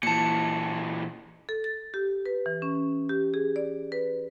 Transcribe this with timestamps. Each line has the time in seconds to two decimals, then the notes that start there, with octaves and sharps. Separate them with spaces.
0.03 A#2 E3 A5 C#7
1.49 A4
1.64 A6
1.94 G4
2.26 B4
2.46 E3
2.62 C#4
3.09 G4
3.34 G#4
3.56 D5
3.92 B4